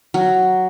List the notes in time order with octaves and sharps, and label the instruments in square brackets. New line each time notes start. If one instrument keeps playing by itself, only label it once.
[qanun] F#3